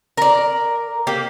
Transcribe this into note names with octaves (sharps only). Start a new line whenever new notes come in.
A#4 D5
A#3 G4